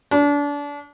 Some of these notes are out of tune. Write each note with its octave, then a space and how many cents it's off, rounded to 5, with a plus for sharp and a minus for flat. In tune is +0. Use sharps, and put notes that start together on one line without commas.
D4 -30